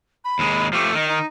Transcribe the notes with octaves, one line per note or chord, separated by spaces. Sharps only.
B5
D#2 G#3
F3 A3 G4
D#3 D#5
D#4